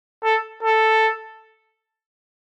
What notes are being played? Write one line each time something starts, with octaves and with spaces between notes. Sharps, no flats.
A4
A4